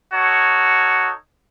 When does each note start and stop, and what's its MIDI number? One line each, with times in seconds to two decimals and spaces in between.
0.13 1.12 63
0.13 1.12 66
0.13 1.12 69
0.13 1.12 73